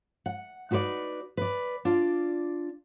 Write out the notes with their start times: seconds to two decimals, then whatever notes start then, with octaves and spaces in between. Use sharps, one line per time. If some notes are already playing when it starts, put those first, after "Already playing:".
0.26 F#5
0.71 D#4 F#4 B4 C5 D5
1.37 B4 D5
1.85 D4 F4 D5